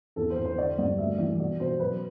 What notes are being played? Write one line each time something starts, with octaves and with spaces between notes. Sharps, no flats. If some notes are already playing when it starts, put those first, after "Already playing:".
E2 A4
C5
E2
C5
D3 D5
G2 D5
D2 E5
E3 D5
B2 D5
B2 C5
F#2 B4